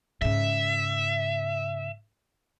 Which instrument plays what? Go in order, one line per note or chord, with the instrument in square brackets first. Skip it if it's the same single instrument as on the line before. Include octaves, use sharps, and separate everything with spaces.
[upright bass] G#2 C#3 [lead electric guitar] E5